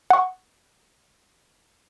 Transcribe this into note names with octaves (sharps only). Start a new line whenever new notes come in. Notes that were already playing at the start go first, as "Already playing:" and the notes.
F#5 C#6